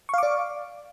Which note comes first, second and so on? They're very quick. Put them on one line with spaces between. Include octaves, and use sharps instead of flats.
C#6 F5 D6 D5